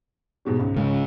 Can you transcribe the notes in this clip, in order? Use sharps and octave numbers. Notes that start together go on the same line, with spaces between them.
G#2 B2 G3
C#2 G#2
C#3 G#3